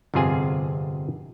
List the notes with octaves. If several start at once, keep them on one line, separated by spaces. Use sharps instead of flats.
G1 F2 C3 F4 G#4 G#5